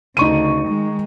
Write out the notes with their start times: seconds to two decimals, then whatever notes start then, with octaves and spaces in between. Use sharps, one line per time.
0.17 D2 C#3 D#4 C#6 D#7
0.68 D#3 G#3